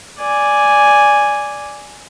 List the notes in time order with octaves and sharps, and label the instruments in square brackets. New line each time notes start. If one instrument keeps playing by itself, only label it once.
[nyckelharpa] D5 G#5